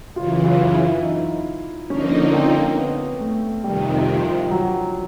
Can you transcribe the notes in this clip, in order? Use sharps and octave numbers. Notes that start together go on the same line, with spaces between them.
F#2 C#3 E3 F4
F4
E4
D#4
D3 F3 A#3 C#4 D#4
C4
B3
A3
F2 C3 D#3 G3
F3
F3
F#3